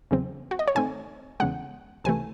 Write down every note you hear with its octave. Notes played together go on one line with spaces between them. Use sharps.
E2 C#3 F#3 C4
F#4
D#5
C#5
G#2 D#3 A3 C4 G#5
E2 C#3 G#3 F#5
C#2 C3 E3 A3 G#5